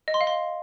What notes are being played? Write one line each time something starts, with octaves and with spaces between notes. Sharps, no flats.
D#5
C6
F5
C6